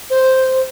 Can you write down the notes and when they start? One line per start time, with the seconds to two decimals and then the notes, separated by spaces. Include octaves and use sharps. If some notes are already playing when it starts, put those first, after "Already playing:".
0.10 C5